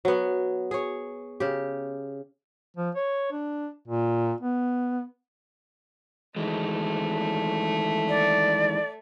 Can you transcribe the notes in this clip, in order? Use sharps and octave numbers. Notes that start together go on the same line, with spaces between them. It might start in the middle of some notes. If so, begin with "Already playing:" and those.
F#3 B3
G#4 C#5
C#3 G4
F3
C#5
D4
A#2
B3
D#3 E3 G#3 A3
D5